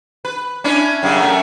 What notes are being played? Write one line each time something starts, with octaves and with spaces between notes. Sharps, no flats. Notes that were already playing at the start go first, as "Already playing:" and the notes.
B4
C#4 D4 E4
F#2 C#3 G3
F#2 A3 A#4